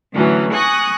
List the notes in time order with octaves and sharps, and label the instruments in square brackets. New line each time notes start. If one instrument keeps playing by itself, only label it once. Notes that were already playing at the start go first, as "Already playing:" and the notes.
[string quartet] A2 D3 E3 F#3 C#4
G#5 C#6 D#6 F#6 A#6